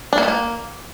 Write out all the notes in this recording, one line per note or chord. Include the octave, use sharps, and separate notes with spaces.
D4
A#3
A3
A#3